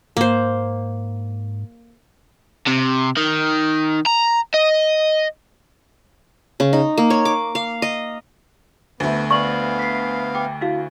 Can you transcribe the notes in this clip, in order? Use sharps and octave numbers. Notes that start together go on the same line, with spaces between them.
G#2 A#3 C5
C3
D#3
A#5
D#5
C#3
D#4
A#3
C#5
D6
F5
D#5
D2 A3 B3
B3 D5 F5 C#6 F#7
B6 C7
G5 D6
E4 F#4 F5